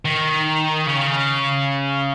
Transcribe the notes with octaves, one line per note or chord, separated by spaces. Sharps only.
D#3
C#3